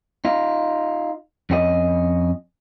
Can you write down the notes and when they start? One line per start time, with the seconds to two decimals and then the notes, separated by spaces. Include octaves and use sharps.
0.25 D#4 F4
1.50 F2 C#4 F#4 D#5